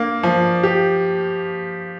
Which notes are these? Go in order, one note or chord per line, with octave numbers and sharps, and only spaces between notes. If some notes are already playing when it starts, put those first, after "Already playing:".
Already playing: A#3 D4
F3
G4